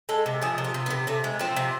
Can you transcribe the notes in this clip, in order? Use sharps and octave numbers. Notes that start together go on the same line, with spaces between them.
G#3 A4
C3
F3 G#4
C3
F4
C3
B3
C3
C3 A3
G#3
F3 C4
C3